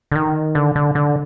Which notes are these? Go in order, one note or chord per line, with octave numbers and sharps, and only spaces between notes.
D3
D#3
D3
D3
D3